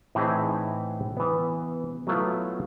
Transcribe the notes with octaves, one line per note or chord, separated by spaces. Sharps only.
A2 E3 C4 D#4 G#4 E5
E3 B3
F#3 A3 B3 E4 F4